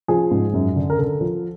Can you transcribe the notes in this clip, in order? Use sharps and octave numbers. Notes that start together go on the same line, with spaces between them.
F3 G#4
G#2
F#2
D3
A#4
D3 A4
F3